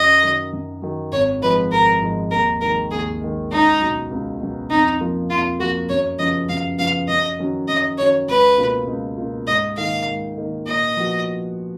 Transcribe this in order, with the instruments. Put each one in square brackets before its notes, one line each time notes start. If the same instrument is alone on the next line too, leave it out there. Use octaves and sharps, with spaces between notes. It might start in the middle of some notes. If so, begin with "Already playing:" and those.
Already playing: [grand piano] F#2 [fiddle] D#5
[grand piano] D#3 F#3
F#2
D#3 F#3
[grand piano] G#1 [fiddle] C#5
[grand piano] G#2 F3 G#3 [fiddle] B4
[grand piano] G#1 [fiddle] A#4
[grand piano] G#2 F3 G#3
[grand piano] D#2 [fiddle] A#4
[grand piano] D#3 G#3 [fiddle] A#4
[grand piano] D#2 [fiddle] G#4
[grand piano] D#3 G#3
[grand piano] C#2 [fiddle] D#4
[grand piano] B2 F#3
C#2
B2 F#3
[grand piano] F2 [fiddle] D#4
[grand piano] F3 A#3 F4
[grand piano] F2 [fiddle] F4
[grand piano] F3 A#3 F4 [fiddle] F#4
[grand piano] F#2 [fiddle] C#5
[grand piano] C#3 F3 B3 [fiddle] D#5
[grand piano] F#2 [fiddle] F5
[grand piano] C#3 F3 B3 [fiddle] F5
[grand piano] F#2 [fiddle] D#5
[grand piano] D#3 F#3 C#4
[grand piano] F#2 [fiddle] D#5
[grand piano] D#3 F#3 C#4 [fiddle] C#5
[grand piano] C#2 [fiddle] B4
[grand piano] B2 A#3 F4
C#2
B2 A#3 F4
[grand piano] G#2 [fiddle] D#5
[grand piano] D#3 A#3 D#4 [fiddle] F5
[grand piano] G#2
D#3 A#3 D#4
[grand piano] A#2 [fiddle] D#5
[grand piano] F3 B3 F#4